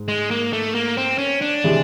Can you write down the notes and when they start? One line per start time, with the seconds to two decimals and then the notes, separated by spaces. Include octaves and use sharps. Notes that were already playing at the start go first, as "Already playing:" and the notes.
Already playing: G#2
0.08 G#3
0.31 A#3
0.53 A3
0.75 A#3
0.97 C4
1.18 C#4
1.42 D4
1.64 C3 E3 G#3